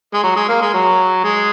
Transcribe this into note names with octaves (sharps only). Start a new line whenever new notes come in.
G#3
F#3
G#3
A#3
G#3
F#3
G#3